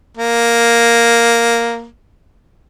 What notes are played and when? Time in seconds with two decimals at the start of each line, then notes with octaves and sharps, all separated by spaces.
0.17 A#3